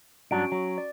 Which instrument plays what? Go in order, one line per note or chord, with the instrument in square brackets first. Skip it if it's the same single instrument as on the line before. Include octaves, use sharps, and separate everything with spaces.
[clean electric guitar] G2 F#3 D4 [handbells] C#4 F#4 D7
[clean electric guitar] F#3
[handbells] D5